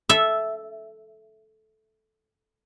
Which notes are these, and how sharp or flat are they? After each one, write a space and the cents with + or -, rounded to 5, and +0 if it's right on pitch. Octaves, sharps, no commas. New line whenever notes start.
A4 -10 E5 +0